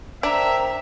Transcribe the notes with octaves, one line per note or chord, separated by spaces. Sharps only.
D4 A#4 C5 E5 G5 A#5